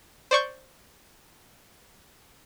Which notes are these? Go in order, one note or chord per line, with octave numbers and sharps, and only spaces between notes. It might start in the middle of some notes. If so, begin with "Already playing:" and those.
C5 D5 C#6 G6